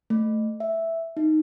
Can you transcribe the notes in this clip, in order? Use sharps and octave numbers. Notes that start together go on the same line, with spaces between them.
A3
E5
D#4